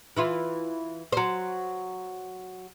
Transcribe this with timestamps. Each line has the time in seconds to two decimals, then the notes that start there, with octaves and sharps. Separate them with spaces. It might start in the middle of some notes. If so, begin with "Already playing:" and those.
0.16 E3 E4 F4
1.12 F#3 C5